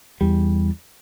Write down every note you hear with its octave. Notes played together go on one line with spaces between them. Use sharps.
E2 G3